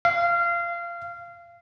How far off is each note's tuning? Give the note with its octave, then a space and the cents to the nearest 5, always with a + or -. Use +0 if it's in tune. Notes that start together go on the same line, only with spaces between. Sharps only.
F5 -20